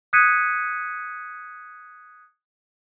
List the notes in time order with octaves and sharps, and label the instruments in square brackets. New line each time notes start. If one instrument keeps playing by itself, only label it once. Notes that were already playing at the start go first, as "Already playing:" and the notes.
[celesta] D#6 F#6 G#6 B6 C#7 D#7